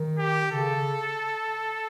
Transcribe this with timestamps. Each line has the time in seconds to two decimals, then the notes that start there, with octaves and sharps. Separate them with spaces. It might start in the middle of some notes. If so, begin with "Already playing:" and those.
Already playing: D#3
0.19 G4
0.51 C#3 A4
0.75 C#3